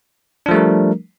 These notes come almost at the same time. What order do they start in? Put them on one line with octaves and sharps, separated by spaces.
D4 F3 A3 G3 A#4